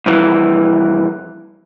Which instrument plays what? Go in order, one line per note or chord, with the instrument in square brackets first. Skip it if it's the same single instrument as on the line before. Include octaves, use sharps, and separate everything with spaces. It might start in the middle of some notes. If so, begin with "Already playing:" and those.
[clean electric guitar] C2 F2 E3